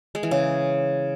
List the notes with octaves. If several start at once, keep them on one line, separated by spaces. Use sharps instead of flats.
G#3
E3
C#3